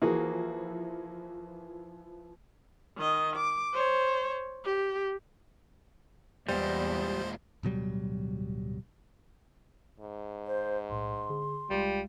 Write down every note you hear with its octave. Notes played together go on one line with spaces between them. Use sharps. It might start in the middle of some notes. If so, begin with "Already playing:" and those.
E3 F3 A#3 E4 F#4 G#4
D#3 D#5
D6
C5 C#5
G4
E2 A#2 G3 G#3 C5
D1 B2 F#3 G3
G#2
C5
B1 A2 C6
D3 G#4
C2 G3 G#3 F4